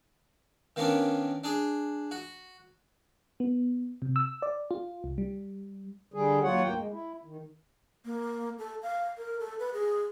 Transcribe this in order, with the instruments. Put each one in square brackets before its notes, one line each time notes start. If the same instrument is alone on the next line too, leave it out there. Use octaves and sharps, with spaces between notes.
[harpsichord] D#3 A#3 B3 C#4 D4
D4 G#4
F#4
[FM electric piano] B3
C3
E6
D5
F4
C2
G3
[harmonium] D3 G3 G#4
D#2 F#3 F4 C#5 F#5
D2 G2 A#3 G5
G#3
E4
D#3
[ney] A#3
A4
F5
A#4
A4
B4
G#4